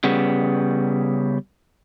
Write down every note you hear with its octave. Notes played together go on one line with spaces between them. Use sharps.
C#3 G3 B3